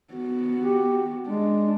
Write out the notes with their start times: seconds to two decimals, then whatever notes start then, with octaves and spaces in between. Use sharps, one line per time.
0.14 B3 F#4
0.61 G4
1.28 G#3 D4